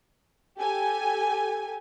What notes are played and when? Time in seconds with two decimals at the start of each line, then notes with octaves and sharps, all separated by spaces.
0.59 G4 A4 G#5